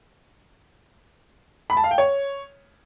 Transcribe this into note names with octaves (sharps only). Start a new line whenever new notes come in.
B5
A5
F5
G5
C#5